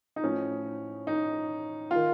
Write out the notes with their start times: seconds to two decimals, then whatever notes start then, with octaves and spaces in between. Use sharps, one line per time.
0.16 D#4
0.23 A2 F3 C#4
1.07 D#4
1.91 D#3 F4